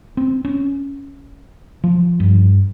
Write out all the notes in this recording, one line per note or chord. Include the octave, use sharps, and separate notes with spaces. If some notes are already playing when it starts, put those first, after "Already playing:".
C4
C#4
F3
G2